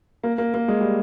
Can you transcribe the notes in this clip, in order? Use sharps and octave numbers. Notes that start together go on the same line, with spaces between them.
A#3
A#3
A#3
G#3
G3